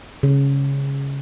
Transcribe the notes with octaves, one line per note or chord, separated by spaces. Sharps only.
C#3